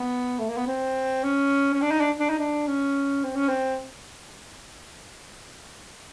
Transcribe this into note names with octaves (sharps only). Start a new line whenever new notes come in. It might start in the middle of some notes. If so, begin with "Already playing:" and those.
Already playing: B3
A3
A#3
B3
C4
C#4
C#4
D4
D#4
D4
D4
D#4
D4
C#4
C4
C#4
C4